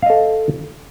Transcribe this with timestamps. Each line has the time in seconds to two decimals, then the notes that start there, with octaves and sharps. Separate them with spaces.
0.02 F5
0.06 D#5
0.10 A4